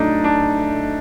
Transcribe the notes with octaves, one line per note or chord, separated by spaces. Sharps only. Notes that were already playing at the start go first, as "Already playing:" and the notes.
Already playing: A2 F#3 A3 D4 D#4
D4